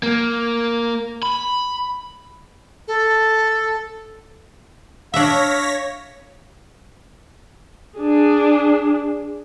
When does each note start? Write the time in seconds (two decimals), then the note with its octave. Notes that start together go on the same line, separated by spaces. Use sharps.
0.03 A#3
1.23 B5
2.88 A4
5.14 D4 C#5 E5 F5 A#6 B6
7.99 D4 G#4